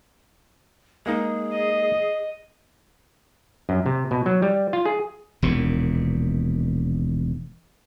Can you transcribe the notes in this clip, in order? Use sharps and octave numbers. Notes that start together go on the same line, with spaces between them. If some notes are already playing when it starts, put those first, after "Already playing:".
G#3 A#3 D#4 G#4
D#5
F#2
C3
B2
F#3
G3
F4
G#4
E1 D#2 A#2